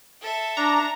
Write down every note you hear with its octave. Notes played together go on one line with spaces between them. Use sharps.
A4 E5
D4 A#5